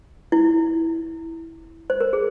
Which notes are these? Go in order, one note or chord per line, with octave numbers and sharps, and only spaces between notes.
E4
C5
A#4
G#4